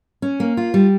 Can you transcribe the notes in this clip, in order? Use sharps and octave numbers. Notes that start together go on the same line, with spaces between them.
C#4
A#3
F4
G3